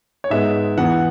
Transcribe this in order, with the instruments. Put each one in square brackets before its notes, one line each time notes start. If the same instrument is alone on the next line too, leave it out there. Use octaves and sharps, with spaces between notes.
[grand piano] C#5
G#2 G#3 B3 E5
E2 E3 B3 F#5